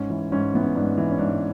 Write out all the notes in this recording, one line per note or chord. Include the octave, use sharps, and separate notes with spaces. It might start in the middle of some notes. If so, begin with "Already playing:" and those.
Already playing: G#2 C#4
E3
G#2 C#4
E3 B3
C#4
G#2 D4
E3
C#4
G#2 D4